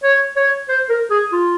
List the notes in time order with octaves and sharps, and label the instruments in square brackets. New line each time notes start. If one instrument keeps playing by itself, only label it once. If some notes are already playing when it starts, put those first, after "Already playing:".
[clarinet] C#5
C#5
C5
A#4
G#4
F4